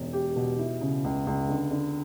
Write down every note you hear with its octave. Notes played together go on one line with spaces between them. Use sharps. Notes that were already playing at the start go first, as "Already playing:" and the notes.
Already playing: E1
G4
B2
E4
C#3
C#2
C#2
D3
D3